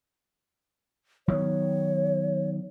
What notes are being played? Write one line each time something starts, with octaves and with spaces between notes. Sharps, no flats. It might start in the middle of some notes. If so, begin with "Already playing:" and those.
D#3 F#3 B3 C#5